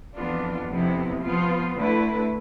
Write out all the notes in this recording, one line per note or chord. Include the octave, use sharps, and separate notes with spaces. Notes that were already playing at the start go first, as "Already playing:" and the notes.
F2 E3 B3 D4 F4
F2 C3 F3 B3 E4
F3 B3 F4
D3 A3 E4 B4